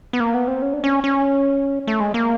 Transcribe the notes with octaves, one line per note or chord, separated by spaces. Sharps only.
B3
A#3
B3
C4
C#4
D4
C#4
C#4
A3
G#3
A#3